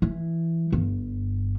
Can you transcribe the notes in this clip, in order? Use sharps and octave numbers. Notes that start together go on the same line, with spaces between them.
E3
G1